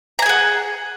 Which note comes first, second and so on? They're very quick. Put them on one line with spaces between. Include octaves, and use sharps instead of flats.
A#5 G#5 G#4 F#5